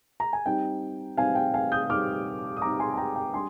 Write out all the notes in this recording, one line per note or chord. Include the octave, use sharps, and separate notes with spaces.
A#5
G#5
G3 C4 D#4 G5
G3 C4 D#4 F5 G#5
G5
F5 G#5
D#6 G6
G3 C4 D#4 D6 F6
D#6
G3 C4 D#4 A#5 D6
G#5 C6
G#5
G5 A#5
G5 A#5
G3 D4 G#5 C6